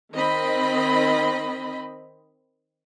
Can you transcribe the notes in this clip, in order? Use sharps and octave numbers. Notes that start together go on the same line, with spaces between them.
D#3 C4 D#5 B5